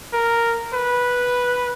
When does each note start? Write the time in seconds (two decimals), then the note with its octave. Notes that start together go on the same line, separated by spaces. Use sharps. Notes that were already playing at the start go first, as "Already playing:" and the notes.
0.13 A#4
0.74 B4